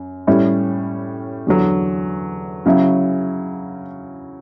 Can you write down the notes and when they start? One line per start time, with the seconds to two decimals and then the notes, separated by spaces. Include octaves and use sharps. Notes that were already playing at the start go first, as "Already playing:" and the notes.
Already playing: F#2
0.27 A2 G3 C#4 E4
1.47 E2 D3 F#3
2.66 C#3 F#3 C#4 E4